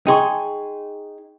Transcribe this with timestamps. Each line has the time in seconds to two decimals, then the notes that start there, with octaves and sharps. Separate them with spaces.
0.07 D#4 G#4 G5 C6 C#6